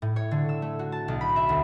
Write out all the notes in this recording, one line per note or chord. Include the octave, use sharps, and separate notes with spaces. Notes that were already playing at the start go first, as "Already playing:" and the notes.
A2
C#5
D3
E6
A3
F#4
A5
B1
B5
E5
D2